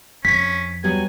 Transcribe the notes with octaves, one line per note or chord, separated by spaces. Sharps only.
F2 C#4 B6
F#3 G3 B3 G#5